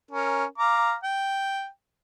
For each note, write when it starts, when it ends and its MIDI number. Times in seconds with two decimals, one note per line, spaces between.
0.11 0.45 61
0.11 0.45 70
0.58 0.94 77
0.58 0.94 82
0.58 0.94 86
1.04 1.67 79